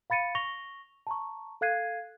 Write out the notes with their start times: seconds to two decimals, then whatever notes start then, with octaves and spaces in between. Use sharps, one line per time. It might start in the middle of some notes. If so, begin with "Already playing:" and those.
0.10 F5 B5 A6 C#7 D#7
0.35 C#6 A#6 F7 G7
1.07 A5 A#5 C#6
1.61 A4 F5 F#6 G#6 C7 D#7